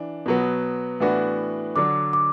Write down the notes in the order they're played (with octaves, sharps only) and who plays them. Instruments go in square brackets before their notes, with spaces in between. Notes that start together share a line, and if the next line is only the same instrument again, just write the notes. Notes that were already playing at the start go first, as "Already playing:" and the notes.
Already playing: [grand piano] E3 D4
B2 F#3 B3
A2 E3 B3 D4 F#4
[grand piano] D3 F#3 D4 [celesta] D6
[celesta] D6